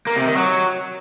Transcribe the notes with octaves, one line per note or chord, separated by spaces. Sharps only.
A#3
C3
D#3
F#3